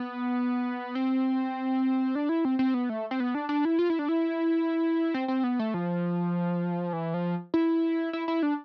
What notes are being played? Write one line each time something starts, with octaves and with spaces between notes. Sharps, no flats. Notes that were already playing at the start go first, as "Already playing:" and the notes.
Already playing: B3
C4
D4
E4
C4
C4
B3
A3
C4
B3
D4
D4
E4
F4
E4
D4
E4
C4
C4
B3
A3
F3
E3
F3
E4
E4
E4
D4